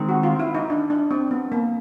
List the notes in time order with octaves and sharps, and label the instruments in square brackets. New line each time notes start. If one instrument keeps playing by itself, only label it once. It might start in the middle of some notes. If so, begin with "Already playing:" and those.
Already playing: [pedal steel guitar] D#3 G#3 C4
[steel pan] F#4
F4
E4
D#4
D4
D4
C4
B3
A#3